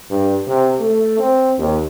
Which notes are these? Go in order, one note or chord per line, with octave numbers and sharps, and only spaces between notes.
G2
C3
A3
C4
D#2